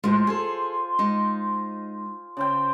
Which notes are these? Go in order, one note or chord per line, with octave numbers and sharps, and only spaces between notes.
A2 G#3 F4 C5
G#4 A4 G#5
G#3 D#4
C#3 C5 G5